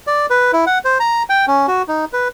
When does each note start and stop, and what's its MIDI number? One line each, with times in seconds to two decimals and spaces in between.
0.07 0.26 74
0.30 0.51 71
0.53 0.65 64
0.67 0.78 78
0.85 0.98 72
1.00 1.23 82
1.30 1.45 79
1.47 1.66 61
1.68 1.82 66
1.88 2.05 63
2.13 2.28 71